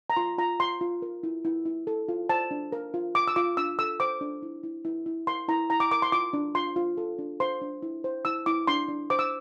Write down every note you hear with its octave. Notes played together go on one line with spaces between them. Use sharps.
A#5
F4 C6
F4 A#5
F4 C6
F4
A#4
E4
E4
E4
A4
F4
C5 A5
D4
A#4
F4
A#4 D6
E6
F4 D6
D4 E6
A4 E6
C5 D6
D4
E4
E4
E4
E4
A#4 C6
E4 A#5
E4 A#5
D6
A#4 D6
C6
F4 D6
D4
F4 C6
F4
A4
D4
C5 C6
D4
E4
C5
E4 E6
E4 D6
D4 C6
D4
C5 D6
E6